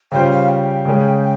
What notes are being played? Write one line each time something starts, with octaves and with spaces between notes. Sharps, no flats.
C#3 G3 C#4 F4 C5 G5
F5
G5
C#3 G#3 C#4 G#4